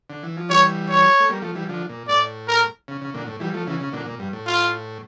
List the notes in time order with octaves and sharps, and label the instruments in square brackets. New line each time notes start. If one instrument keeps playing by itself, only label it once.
[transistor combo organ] D3
E3
F3
[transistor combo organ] E3 G3 [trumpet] C#5
[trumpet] C#5
[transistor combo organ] A3
G3 A#3
F3 A3
E3 G3
D3 F3
A#2
[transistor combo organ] A2 [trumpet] D5
[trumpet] A#4
[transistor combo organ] C#3
C#3
A#2 D3
A2
E3 G3
F3 A3
C#3 E3
C#3
A#2 D3
A#2
G2
A2
[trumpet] F4